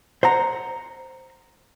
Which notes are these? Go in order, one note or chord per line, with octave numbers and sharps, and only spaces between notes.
C5 F#5 A#5